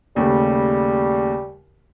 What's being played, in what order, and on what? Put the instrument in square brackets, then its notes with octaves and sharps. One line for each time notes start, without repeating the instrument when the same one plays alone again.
[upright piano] D#2 C#3 A3 [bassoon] G3